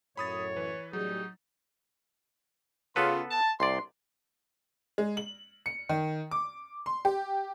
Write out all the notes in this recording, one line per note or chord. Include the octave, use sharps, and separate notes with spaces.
F#2 A2 C#5 B5 D#6 A6
E3 B4
A1 F#3 G3 D#4 G#4
C#3 B3 F4 A4 B4 C6
A5
C2 D5 C6
G#3
F#7
C#7
D#3
D6
C6
G4